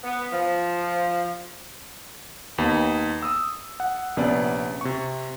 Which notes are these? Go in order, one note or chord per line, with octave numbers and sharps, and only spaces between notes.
B3
F3
D#2 B3 D#4
D#6 E6
F#5
A#1 C3 B3 C#4 D5
C3 C#6